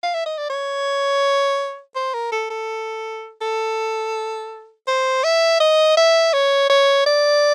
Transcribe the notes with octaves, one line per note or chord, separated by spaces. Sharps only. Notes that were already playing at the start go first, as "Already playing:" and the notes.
F5
E5
D#5
D5
C#5
C5
A#4
A4
A4
A4
C5
E5
D#5
E5
C#5
C#5
D5